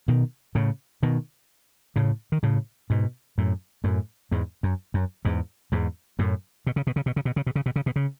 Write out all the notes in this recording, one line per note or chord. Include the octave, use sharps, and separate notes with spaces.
B2 D#3
A2 C#3
B2 D#3
A2 C#3
D#3
A2 C#3
G#2 B2
F#2 A2
F#2 A2
E2 G#2
F#2
F#2
E2 G#2
E2 G#2
F#2 A2
B2
C#3
B2
C#3
B2
C#3
B2
C#3
B2
C#3
B2
C#3
B2
C#3